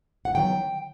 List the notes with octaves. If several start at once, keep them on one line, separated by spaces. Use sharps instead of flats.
F#5
D#3 F#3 B3 G5